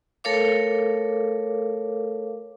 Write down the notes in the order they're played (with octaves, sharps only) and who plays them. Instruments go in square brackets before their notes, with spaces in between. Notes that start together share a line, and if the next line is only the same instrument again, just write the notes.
[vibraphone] A3 A4 A#4 C#5 F5 D6